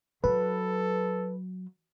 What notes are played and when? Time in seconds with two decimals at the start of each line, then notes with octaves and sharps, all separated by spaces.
0.24 F#3 A4 B4